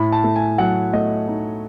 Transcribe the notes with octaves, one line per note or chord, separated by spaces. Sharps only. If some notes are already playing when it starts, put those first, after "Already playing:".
Already playing: A2 B5
A5
A3
G#5
F#3 F#5
A3 D#5
D#4